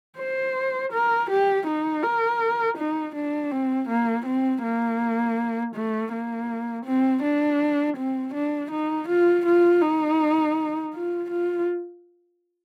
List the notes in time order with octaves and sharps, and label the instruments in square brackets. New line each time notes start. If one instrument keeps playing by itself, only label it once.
[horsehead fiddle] C5
A#4
G4
D#4
A#4
D#4
D4
C4
A#3
C4
A#3
A3
A#3
C4
D4
C4
D4
D#4
F4
F4
D#4
F4
F4